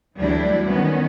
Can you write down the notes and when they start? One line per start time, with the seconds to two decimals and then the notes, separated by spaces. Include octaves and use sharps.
0.18 D2 E3 F#3 G3 D4 E4
0.67 D#3 B3 C#4